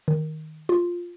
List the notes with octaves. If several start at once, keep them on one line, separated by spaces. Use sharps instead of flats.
D#3
F4